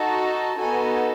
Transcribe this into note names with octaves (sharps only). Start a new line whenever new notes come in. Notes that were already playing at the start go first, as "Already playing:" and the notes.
Already playing: D#4 F#4 A4 A5
B3 D#4 F#4 A4 G#5